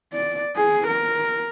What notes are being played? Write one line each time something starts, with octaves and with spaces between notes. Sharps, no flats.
D5
G#4
A#4